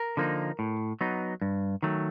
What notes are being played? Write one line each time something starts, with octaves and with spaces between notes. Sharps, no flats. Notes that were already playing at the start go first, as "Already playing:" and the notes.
Already playing: A#4
D3 F3 A#3 D#4
A2
F#3 B3 D#4
G2
D#3 F#3 A3